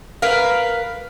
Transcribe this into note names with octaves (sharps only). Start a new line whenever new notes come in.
A#4 B4 F5